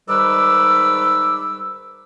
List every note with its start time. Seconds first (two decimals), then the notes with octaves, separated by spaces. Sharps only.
0.09 G#2 D#3 G3 B4 D6 E6